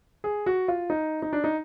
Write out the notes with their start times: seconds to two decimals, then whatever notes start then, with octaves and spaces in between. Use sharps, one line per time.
0.24 G#4
0.46 F#4
0.68 F4
0.90 D#4
1.22 D#4
1.33 D4
1.44 D#4